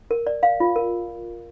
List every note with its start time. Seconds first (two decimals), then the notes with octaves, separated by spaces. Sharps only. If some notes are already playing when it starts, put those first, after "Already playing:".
0.11 A#4
0.27 D5
0.43 F5
0.60 F4
0.76 A#4